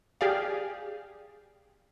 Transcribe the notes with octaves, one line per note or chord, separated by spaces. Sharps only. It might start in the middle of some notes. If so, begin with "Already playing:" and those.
G4 G#4 D5 F5